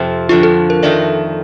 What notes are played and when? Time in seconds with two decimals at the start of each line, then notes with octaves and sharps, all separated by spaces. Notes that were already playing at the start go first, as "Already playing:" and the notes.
Already playing: F2 C3 F3 C4
0.29 F2 D3 F3 F4
0.43 A4
0.70 A#4
0.83 F2 D#3 A3 D#4 D5